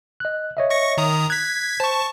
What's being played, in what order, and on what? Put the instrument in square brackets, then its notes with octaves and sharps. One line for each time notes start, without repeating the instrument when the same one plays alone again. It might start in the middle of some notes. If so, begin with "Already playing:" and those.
[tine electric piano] D#5 F#6
C#5 D#5 E5
[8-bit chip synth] C#6 A#6 C#7
D#3 A#5 D#6
[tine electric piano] F#6 [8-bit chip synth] G#6 B6
[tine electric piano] C5 [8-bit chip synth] A5 C#6